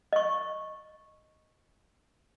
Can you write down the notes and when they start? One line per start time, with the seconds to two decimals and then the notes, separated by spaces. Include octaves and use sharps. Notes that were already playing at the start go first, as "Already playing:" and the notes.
0.13 D#5 C#6